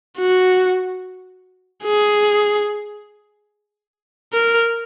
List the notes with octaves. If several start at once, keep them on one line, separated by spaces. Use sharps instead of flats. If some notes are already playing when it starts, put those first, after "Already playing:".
F#4
G#4
A#4